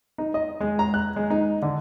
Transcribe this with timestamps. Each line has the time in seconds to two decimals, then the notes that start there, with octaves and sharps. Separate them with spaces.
0.18 D#4
0.34 D#5
0.61 G#3
0.79 A#5
0.94 F#6
1.16 G#3
1.30 D#4
1.62 D3